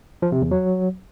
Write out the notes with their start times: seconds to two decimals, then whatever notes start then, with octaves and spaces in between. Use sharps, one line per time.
0.22 F3
0.32 C3
0.42 E2
0.51 F#3